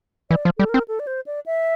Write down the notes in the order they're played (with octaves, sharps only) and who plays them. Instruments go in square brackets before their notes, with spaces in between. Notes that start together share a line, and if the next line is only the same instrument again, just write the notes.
[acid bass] E3 [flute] D5
[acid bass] F3
[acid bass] G3 [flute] A4
[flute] A#4
[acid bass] C4
[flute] A4
D5
C5
D5
E5